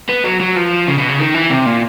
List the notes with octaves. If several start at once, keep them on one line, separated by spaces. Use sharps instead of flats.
B3
F#3
F#3
F3
C#3
B2
C#3
D#3
E3
C3
A#2